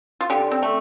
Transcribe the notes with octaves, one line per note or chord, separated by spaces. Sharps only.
F4
D3 G4
C4
A3